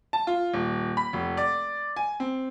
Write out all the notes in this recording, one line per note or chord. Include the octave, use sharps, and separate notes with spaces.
A5
F4
D#1
B5
F1
D5
G#5
C4